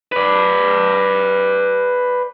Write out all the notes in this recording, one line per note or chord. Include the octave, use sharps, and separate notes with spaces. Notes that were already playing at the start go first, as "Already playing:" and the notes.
B4 D5